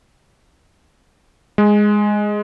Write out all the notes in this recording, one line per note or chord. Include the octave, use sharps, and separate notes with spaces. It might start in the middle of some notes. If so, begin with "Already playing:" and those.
G#3